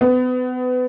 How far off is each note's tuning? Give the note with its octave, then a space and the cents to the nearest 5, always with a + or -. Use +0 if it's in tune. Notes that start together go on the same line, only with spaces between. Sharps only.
B3 +30